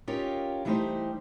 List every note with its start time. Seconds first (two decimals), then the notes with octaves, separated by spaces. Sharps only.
0.07 C#4 D#4 F4 G4 A#4 C#5
0.65 E3 G3 A3 D#4 G4 C5